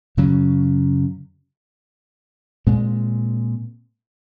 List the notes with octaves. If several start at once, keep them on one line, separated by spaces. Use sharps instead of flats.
F#2 C#3 F#3 C#4
A#2 G#3 C4